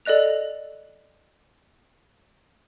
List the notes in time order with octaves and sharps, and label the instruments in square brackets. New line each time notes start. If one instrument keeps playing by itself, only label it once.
[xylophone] A4 D5 D#5 F#6 F7